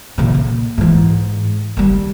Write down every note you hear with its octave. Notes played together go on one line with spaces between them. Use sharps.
A#1 C#3
A#2
G#2 E3
D#3 G3